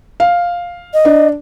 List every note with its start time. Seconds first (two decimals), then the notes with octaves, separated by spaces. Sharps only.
0.20 F5
0.94 D#5
1.05 D4